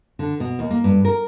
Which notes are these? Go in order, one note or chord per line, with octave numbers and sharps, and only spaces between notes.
D3
B2
D#2
A#3
G2
A#4